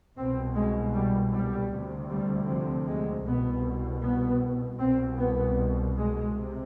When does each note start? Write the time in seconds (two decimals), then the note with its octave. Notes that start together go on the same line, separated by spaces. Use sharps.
0.16 C2 B2 C4
0.55 G#3
0.94 G3
1.33 G3
1.71 D2 C3
2.10 G3
2.48 F3
2.87 G#3
3.25 C2 B2 B3
4.03 B3
4.79 C2 B2 C4
5.18 B3
5.96 G#3
6.35 C3